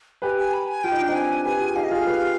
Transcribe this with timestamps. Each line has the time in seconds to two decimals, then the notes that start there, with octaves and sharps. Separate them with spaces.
0.22 G4 B4 G#5
0.38 G#5
0.54 B5
0.68 G#5
0.84 F4 G5
0.92 D#4
1.00 D4
1.06 C4 D#4 G5
1.15 G#5
1.45 G4 B4 G#5
1.61 F4 G#4
1.76 D#4 G4 F5
1.84 D#5
1.91 F4 G#4 F5
2.06 G4 B4